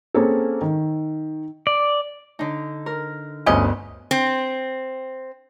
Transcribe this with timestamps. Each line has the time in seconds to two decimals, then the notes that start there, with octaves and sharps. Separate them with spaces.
0.14 A#3 C4 C#4 G#4 A4
0.61 D#3
1.67 D5
2.39 D3 D#4
2.86 A#4
3.46 G1 D2 C3 B3 C#4 D#5
4.11 C4